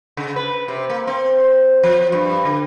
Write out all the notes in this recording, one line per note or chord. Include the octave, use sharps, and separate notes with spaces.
C#3
B4
C3
A#3
C4
F3
G2
D3